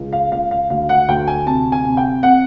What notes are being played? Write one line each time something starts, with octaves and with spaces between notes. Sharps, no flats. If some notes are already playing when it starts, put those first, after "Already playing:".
Already playing: C#2 C#3
F5
C#2 F5
F5
D2 F5
F#5
D2 G5
G#5
C3 A5
G#5
C3
G5
C4 F#5